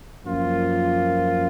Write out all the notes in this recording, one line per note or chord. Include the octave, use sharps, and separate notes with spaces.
F#2 F3 A#3 F4